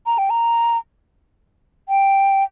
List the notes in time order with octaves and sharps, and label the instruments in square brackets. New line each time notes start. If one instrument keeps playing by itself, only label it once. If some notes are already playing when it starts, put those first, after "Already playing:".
[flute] A#5
G5
A#5
G5